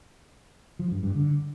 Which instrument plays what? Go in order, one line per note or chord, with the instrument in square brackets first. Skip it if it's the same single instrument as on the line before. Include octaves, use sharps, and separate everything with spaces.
[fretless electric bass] F3
G2
G2
D3